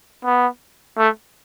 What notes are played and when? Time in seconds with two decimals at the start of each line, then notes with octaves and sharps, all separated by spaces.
0.25 B3
0.98 A3